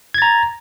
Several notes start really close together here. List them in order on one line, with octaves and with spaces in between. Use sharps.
G#6 A6 A#5